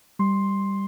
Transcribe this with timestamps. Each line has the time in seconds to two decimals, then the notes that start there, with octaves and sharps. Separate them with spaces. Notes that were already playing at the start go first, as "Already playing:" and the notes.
0.19 G3 C6